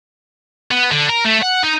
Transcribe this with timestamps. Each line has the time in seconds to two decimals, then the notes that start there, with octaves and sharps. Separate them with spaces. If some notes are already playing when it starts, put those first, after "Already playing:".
0.71 B3
0.92 D3
1.09 A#4
1.24 A3
1.42 F#5
1.63 D#4